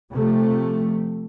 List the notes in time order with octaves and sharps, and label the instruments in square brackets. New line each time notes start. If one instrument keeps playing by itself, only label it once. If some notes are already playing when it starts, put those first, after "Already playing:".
[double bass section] C3 F3 A3